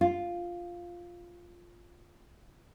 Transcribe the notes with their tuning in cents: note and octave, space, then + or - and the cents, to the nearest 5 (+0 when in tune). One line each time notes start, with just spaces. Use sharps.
F4 +0